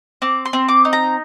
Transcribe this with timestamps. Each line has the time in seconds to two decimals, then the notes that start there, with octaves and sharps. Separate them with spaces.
0.22 C4 D6
0.45 C6
0.53 C4
0.68 D6
0.85 D#4
0.93 A#5